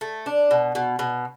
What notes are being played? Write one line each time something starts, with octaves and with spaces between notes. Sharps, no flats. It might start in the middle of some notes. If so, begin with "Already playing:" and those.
A3
D4
B2
B2
B2